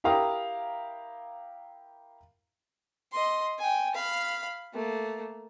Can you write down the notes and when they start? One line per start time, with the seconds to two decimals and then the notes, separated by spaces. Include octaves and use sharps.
0.04 E4 G4 A#4 F5 A#5 D#6
3.12 D#5 C6
3.59 G5 G#5
3.95 F5 B5
4.74 A3 A#3